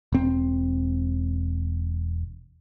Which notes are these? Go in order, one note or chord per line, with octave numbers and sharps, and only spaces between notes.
E1 C4